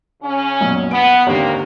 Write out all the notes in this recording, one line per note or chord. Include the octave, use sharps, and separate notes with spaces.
C#3 C#4
B1 F#2 A#2
B3 D7
G#1 D#2 D3 A#3 C4